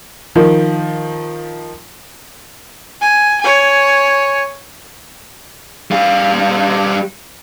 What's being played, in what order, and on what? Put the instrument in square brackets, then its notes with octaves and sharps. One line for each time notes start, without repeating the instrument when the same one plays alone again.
[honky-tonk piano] D#3 F3
[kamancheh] G#5
C#5 G#5
[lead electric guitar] G3 F5